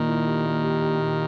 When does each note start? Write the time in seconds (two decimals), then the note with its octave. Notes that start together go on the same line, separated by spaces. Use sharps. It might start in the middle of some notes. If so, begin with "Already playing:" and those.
Already playing: A#2 D#3
0.09 E4
0.26 G4
0.45 A#3
0.63 G4
0.81 G4
0.99 A#2